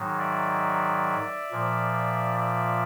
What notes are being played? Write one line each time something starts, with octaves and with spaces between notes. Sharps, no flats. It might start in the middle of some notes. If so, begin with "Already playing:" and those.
Already playing: G#2 D#3 F#3
D5 E5
A#2 F3
D5 E5